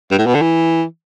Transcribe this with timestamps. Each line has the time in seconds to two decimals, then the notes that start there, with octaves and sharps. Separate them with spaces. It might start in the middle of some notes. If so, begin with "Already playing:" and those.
0.11 G2
0.18 A2
0.26 B2
0.35 D3
0.41 E3